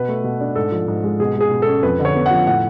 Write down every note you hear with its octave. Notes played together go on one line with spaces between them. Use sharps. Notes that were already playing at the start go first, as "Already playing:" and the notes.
Already playing: B2 B4
A3
B2
D4
G#2 A4
F3
G#2
G#3
B2 G#4
G#3 G#4
B2
C#4 A4
F2 B4
D3
C#5
B3
F3 F#5
A2 F#5